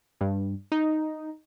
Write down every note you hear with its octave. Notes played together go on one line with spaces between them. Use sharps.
G2
D#4